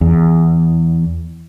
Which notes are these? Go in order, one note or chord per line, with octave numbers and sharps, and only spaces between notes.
E2